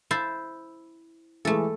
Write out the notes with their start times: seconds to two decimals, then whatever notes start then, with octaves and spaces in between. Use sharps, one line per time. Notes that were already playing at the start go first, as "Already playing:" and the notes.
0.11 E4 C5 A5
1.45 E3 G#3 A3 A4